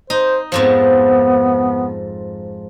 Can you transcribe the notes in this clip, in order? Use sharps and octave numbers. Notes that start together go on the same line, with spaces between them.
D#4 C5
F2 G#2 F3 B3